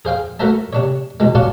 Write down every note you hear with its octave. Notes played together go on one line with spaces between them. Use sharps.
G#4 C5 F5 G5
A3 F#4 A#4 C5 E5 A5
C3 D4 C#5
E2 B2 G#3
C#4 F4 F#4 C#5 D5 A5